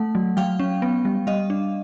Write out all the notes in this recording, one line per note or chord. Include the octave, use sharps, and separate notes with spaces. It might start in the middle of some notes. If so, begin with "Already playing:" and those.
Already playing: A3 F#5
F#3
F#3 F5 G5
C#4
B3
G3
G3 D#5 F5
D4